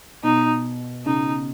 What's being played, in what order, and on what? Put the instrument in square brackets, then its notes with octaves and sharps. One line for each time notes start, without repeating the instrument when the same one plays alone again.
[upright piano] B2 [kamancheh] D#4
[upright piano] C#3 [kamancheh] D#4